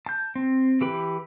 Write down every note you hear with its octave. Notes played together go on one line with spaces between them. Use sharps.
A5 G6
C4
E3 G4 B4